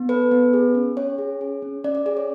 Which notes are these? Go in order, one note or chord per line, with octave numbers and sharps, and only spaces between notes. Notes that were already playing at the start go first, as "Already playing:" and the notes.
Already playing: B3
A4 B4
B3
G#4
C#4
C#4 C#5
G#4
G#4
C#4
C#4 D5
D5
G#4 D5
C#5